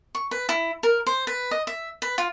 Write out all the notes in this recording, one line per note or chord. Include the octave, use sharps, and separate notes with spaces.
C#6
B4
E4
A#4
C5
B4
D#5
E5
B4
F4